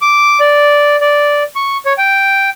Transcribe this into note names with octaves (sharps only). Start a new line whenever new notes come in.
D6
D5
D5
C#6
C#5
G5